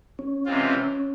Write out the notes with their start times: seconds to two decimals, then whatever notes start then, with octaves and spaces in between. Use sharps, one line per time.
0.19 C#4
0.46 C3 E3 G#3 C4 F4